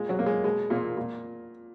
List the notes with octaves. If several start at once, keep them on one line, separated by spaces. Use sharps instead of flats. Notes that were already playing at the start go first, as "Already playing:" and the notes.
Already playing: A#2 G#3
F#3
A#3
G#3
B2 G#3
A#2 A#3
A#2